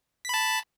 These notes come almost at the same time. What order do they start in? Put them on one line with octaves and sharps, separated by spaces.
B6 B5 A5